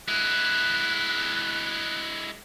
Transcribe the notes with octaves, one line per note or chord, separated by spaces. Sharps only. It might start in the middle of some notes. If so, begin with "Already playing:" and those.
G#3 E4 F#6